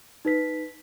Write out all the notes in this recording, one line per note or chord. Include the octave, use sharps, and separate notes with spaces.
D#4 B4 B6